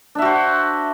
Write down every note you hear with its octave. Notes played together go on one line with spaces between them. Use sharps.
D4 F#4 C5 E5